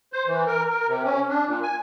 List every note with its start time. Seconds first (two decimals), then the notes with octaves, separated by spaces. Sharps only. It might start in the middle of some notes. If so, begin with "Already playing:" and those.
0.13 C5
0.27 E3
0.47 A#4
0.70 A#4
0.88 C3
1.05 C#4
1.29 D4
1.47 A#2
1.63 G#5